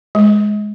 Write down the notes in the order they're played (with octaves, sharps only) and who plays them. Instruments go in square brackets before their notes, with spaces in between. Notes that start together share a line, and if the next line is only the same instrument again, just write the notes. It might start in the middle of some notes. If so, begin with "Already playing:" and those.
[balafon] G#3